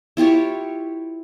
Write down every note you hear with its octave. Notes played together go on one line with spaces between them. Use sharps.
E4 F4 G4 C#5